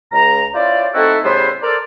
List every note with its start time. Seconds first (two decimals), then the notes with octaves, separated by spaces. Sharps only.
0.12 C#2 A#5
0.54 C#4 E4 F4 C5 D5
0.94 A3 C4 D#4 E4 F#4 A4
1.24 A2 C#3 G3 B3 E4 C5
1.62 A4 A#4 C5 D5